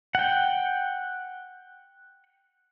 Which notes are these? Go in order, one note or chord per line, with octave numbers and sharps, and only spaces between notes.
F#5 G5